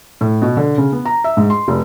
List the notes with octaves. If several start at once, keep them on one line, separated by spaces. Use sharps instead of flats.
A2
B2
D3
C#3
B3
A#5
E5
G#2
C6
F1